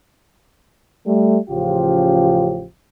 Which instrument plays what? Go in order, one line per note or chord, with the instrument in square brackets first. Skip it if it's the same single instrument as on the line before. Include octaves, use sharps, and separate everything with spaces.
[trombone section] G3 A3
A1 C#3 F3 F4 G4